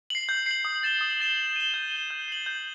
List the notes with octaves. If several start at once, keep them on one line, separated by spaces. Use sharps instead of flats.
C7 F#7
G6
C7 F#7
D#6
A6 E7 G7
D#6
A6 E7 G7
G6
D#7 G7
G6
D#7 G7
G6
C7 F#7
G6